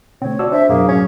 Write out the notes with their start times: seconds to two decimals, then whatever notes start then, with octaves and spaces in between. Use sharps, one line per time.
0.22 B2 D3 A3 C4 C#5
0.39 F#4 D5 A5 E6
0.52 C4 D4 E5
0.69 F#2 B2 F#3 A#3 G#4
0.88 A2 F#3 C#4